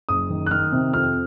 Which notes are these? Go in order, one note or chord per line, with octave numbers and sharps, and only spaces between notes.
F#1 D#6
D#3
F#6
D#3 F6
C3
F2 F6